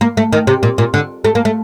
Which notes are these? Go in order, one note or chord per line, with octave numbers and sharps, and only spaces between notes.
A#3
A3
D#3
C3
A#2
A#2
D3
A3
A#3
A3